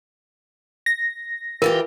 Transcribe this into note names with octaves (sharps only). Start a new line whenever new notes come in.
A#6
E3 F4 G4 A#4